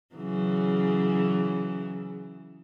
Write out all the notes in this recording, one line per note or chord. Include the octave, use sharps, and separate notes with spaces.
C#3 E3 F#3